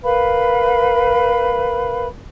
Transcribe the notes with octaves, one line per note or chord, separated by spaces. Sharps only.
A#4 B4 F5 B5